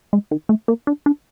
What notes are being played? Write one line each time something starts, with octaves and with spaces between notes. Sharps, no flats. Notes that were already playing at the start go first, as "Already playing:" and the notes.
G#3
D#3
A3
A#3
D4
D4